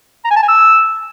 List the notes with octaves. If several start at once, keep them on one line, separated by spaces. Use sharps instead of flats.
A#5
G#5
A5
G#5
E6